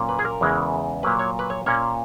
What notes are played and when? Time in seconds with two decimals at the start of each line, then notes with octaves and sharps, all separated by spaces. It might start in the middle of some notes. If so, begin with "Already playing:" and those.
Already playing: A#2 F#3 A#3 C#4
0.09 B4
0.19 G#4
0.25 A#4
0.41 E2 C#3 E3 G#3
1.03 A#2 F#3 A#3 B4
1.19 C#5
1.39 B4
1.50 C#5
1.66 A#2 A#3 C#4 C#5